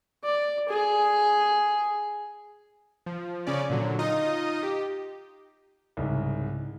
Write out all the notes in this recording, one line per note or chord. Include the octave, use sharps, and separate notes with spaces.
D5
G#4
F3
C#3 C#4 D5
A#2 D3 F#3
D#4 F4 D#5
G4
C2 G#2 C#3